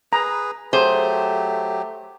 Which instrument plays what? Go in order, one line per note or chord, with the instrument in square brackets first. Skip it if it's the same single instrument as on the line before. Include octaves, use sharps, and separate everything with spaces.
[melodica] G#4 B4 [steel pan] A#5
[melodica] F#3 G4 [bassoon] A3 [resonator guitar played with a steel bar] G#4 C5